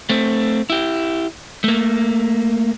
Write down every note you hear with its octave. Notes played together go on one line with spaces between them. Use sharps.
A3 C4
E4 G4
A3 A#3